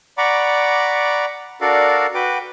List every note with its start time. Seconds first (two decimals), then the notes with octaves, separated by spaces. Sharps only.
0.18 D5 F#5 A#5 B5 C#6 D6
1.61 D4 F#4 A4 A#4 D5 F5
2.14 F#4 B4 G5 D6